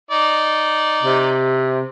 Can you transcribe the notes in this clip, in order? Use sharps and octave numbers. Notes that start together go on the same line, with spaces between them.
D#4 D5
C3